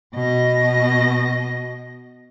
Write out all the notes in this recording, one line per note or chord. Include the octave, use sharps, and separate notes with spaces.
B2 D#5